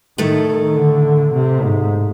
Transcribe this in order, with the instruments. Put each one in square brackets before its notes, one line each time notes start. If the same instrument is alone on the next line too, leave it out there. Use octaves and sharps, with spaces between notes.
[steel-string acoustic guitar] A2 A3 [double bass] D#3
[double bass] D#3
D3
C3
G#2